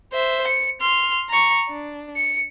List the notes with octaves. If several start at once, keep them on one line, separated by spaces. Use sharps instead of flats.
C5 E5
C#7
C6 F6
A#5 C#6
D4
C#7